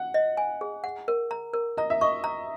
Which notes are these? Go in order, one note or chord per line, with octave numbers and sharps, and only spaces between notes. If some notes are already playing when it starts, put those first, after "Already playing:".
Already playing: F#5
D#5
G#5
G#4
F#5
A#4
A#5
A#4
D#5 A#5
E5
D#5 C#6
A#5